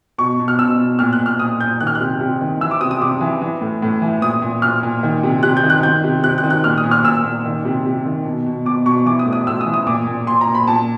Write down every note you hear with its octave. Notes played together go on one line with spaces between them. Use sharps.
B2 C#6
B2
F6
B2 E6
B2
A#2 F6
F#6
A#2
F6
A#2 D#6
A#2 G6
D#3 F#6
F6
F#6
C3
C3
D#3
E3 E6
D6
C3 D#6
D#6
C3 D6
E3
E3
A2
A2
E3
A#2 D#6
A#2
A#2 F6
A#2
D#3
C3
C3 F#6
G6
D#3
F#6
D#3 G6
C3
C3 F#6
F#6
D#3
F#6
A#2 F6
D#6
A#2
F6
A#2 E6
A#2
D#3
C3
C3
D#3
B2
B2
B2 D6
B2 C#6
E3 D6
D#6
A2
D#6
A2 E6
D#6
E3
D#6
A#2 D6
A#2
A#2 C6
A#5
A#2
B5
A#2 A5